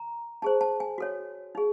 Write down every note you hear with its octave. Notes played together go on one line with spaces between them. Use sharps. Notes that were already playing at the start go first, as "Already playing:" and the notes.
Already playing: A#5
D#4 G#4 C5 A5
A5
G#5
F#4 A4 C#5
D#4 G#4